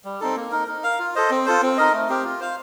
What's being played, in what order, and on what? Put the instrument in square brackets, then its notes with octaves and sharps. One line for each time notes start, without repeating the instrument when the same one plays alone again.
[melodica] G3
C4 D#4 A4
A#3
D#4 A#4
D#4
A#4 F5
F4
A4 C5 D#5
C4
F4 A4 C5
C4
D#4 A#4 D#5
A3
C4 G4 A#4
F4
C5 F5